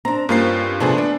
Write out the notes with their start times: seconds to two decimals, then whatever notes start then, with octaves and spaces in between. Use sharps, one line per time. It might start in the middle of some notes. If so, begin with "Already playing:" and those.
0.05 C4 D4 A#5
0.29 G2 A#3 C4 C#4 F4 C7
0.80 C3 F3 A3 B3 D4 G#4
0.98 B3 D4